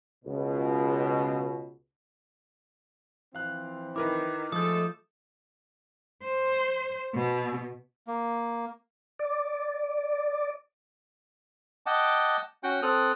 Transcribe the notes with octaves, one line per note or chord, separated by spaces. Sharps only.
C#2 B2
E3 F3 C4 F5 F#6
D#3 E4 A#4 B4 D6
F3 G#3 A3 A4 D#6 G6
C5
B2
A#3
D5
D#5 F#5 G5 A5 D6
C#4 F#4 F#5 G5
C4 A4 D#6 F6 F#6